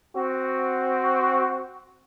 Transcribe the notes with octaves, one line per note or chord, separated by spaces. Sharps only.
C4 F#4